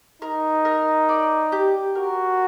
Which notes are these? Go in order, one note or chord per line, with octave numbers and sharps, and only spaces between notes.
D#4 A#4
A#4
D5
G4
F#4 A#4